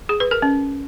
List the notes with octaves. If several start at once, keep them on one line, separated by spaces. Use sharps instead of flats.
G#4
B4
A#4
C#4